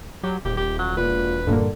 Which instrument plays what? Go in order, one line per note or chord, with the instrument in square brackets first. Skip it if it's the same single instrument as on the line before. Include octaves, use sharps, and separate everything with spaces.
[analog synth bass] F#3 [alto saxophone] G4
[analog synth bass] D#1 [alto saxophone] G4
[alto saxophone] G4
F#3
[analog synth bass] E1 [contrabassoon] A#2 [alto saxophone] B4
[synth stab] G2 A#2 A#3 [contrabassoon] D3